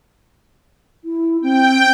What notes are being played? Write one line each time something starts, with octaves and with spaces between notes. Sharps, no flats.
E4
C4 G5